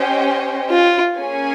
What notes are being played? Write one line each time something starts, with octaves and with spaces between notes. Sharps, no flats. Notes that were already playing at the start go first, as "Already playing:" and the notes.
Already playing: C#4 G4 C5 D#5 G5
F4
A#3 C#4 G#4 C#5 G#5